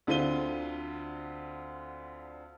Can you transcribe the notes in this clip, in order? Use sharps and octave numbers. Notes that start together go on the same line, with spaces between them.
D2 D3 C4 F4 D#7 G7